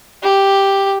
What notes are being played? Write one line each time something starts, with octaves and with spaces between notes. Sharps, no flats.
G4